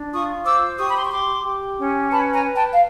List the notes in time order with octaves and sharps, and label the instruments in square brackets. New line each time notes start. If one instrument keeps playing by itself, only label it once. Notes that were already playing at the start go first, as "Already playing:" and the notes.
Already playing: [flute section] D4
F4 C#6 D#6
C5 D6 E6
G4 C#6 D#6
B5
C6
C#6
G4 C6 D6
G4
C#4
B4 A5 B5
G#5 A#5
B4
G5 A5
F5